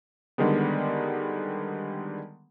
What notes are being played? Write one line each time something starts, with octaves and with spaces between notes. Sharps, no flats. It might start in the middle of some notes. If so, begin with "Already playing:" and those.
D3 D#3 G3 G#3 B3